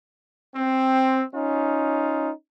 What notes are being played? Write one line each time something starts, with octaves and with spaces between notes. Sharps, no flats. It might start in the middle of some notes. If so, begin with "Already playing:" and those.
C4
C#4 D#4 F4